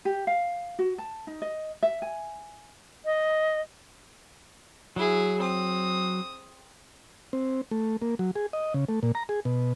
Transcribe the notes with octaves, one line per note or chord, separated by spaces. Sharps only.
G4
F5
F#4
A5
D#4
D#5
E5
G#5
D#5
F#3 E4 G#4
C4 D#6
C4
A3
A#3
F#3
G#4
D#5
C#3
A3
A#2
A#5
G#4
B2